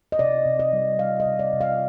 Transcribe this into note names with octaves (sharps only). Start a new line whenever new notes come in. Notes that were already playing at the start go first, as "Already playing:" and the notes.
D#5
C3 D5
C3
D#5
G3
G3 F5
D#5
C3
D5
C3
F5